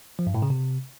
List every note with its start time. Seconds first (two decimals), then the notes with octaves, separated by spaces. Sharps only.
0.19 F3
0.27 G2
0.35 A2
0.42 C#3
0.50 C3